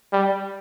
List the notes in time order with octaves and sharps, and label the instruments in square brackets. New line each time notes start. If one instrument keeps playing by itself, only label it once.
[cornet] G3